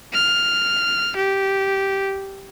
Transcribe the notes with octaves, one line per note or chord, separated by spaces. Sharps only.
F6
G4